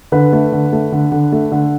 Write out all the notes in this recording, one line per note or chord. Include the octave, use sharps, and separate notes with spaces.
D3 B4
A3
D3
A3
D3
D3
A3
D3